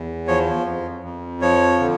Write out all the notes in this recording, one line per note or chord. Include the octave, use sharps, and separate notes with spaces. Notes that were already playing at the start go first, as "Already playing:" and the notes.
Already playing: E2
F3 C#5
F2
F2
F3 C#5
D3